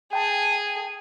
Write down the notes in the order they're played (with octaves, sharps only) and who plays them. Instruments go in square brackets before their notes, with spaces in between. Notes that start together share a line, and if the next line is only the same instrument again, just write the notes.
[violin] G#4 [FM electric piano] G5 A5